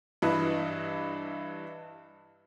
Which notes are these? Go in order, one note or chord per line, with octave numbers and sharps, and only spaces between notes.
G2 E3 E4 B4 D#5